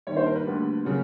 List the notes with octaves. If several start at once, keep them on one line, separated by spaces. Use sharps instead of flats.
D#2 D#3 G3 C#5
C5
A#4
B4
D2 D3 G3 A#3
C#3 F#3 A#3